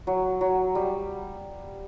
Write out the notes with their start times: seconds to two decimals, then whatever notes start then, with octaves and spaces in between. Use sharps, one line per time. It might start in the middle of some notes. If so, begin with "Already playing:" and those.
0.07 F#3
0.41 F#3
0.75 G3